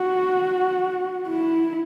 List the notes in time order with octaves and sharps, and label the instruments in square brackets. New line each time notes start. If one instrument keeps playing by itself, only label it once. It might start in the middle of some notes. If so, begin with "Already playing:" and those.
Already playing: [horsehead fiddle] F#4
E4